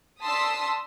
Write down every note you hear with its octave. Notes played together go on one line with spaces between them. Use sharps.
D4 A5 C6 D#6 E6 B6